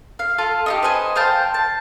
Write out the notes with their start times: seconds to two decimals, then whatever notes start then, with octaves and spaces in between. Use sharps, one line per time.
0.19 F5
0.38 F4 A4 F5
0.66 D#4 F4 G4
0.83 B4 C5 D#5 G#5
1.16 C5 F5 G5 A5
1.54 A5